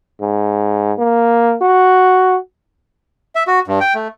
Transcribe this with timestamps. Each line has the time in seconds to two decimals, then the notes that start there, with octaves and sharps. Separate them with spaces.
0.21 G#2
0.98 A#3
1.61 F#4
3.35 E5
3.47 F#4
3.67 G2
3.80 G5
3.95 A3